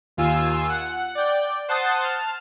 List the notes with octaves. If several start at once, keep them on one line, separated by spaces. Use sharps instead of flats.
D#2 F4 G#5 E6
F#5
D5 G5
C5 F#5 A5 C6 D#6 A6
A5 F6